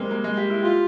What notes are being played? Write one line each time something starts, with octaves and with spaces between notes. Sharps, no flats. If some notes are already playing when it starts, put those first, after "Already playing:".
Already playing: G3 G#3 A#3 C4
A#3
G#3
G4
E4
F4 G4